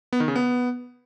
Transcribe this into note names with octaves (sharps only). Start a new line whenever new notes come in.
B3
D#3
C#3
B3